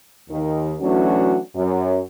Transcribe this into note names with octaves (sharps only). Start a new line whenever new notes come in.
D#2 D#3
E3 F#3 A3 C#4 D4 F#4
F#2